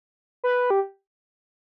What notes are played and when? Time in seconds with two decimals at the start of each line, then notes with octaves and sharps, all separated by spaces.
0.44 B4
0.70 G4